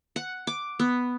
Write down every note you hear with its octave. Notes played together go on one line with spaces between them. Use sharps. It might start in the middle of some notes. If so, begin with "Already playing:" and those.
F#5
D6
B3